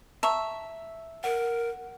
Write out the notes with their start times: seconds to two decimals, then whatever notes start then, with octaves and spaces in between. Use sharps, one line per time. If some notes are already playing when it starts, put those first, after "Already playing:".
0.23 E5 A5 A#5 C#6
1.24 A#4 F#5